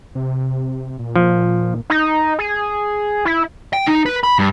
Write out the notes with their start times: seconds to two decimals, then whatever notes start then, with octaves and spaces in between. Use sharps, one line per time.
0.15 C3
0.99 A#2
1.16 F3
1.90 D#4
2.39 G#4
3.25 E4
3.73 G5
3.87 D#4
4.06 B4
4.23 B5
4.39 G2